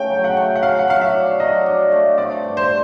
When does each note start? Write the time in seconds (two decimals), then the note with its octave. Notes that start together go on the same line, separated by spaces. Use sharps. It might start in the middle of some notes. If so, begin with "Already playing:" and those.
Already playing: C#3 A3 G5
0.10 F#3
0.24 F#5
0.37 A3
0.56 F#5
0.63 F#3 F5
0.79 F#5
0.88 F#3 F5
1.01 E5
1.14 D4
1.40 F#3 D#5
1.66 D4
1.92 A3
2.18 C4 D5
2.44 G2
2.57 C5